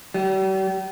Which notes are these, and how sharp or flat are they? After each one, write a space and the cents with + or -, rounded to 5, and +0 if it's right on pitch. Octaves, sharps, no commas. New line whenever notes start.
G3 -45